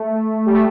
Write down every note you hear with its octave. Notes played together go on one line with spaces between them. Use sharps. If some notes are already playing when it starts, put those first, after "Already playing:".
Already playing: A3
G3
A3